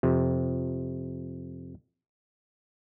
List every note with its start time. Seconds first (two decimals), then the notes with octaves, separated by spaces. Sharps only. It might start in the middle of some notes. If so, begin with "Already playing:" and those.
0.03 F2 C3